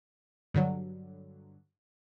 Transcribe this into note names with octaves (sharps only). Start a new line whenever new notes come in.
G2 D3 F#3